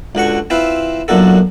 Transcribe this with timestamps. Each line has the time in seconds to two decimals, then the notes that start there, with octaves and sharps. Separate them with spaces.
0.15 C#2 D3 F#4 C#6
0.50 C4 E4 F4 B4 C5
1.08 B1 F#2 A#2 D3 F#4 A4